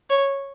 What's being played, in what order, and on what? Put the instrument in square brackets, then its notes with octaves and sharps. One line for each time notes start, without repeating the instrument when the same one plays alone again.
[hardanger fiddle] C#5